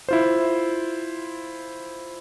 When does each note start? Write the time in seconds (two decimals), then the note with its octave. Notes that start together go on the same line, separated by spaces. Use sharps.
0.09 E4 F4 C5